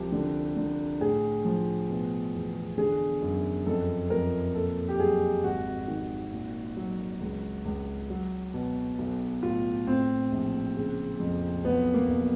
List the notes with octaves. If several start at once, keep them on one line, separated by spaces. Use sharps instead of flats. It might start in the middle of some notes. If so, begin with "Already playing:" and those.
Already playing: C2 F3 G4
D3
D3
A2 G#4
F3
B2
E2
D3 G#4
F#2
F2 A4
F2 A#4
A#2 A4
G4
F#3 G#4
G#1 F#4
D#3
A#2
F#3
C#2
C#2
F#3
B2
B1
A2 F4
A2 C4
A#1
C#3
F2
B1 B3
A#3
B1